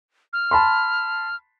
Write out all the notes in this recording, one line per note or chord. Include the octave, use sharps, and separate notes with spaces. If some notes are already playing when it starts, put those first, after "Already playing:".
F6
A5 B5 C6